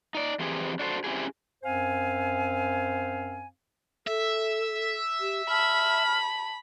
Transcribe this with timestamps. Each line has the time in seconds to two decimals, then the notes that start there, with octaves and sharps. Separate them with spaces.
0.15 D#4 D5
0.39 F2 E3 C4 G4 G#4
0.79 D4 F#4 A4 C5
1.04 C4 C#4 E4 G4 G#4
1.63 F#2 C4 C5 F5 G#5
4.07 A4 E5
5.20 G4
5.49 A5 B5 F6